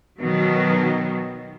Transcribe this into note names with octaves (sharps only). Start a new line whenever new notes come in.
B2 D#3 F#3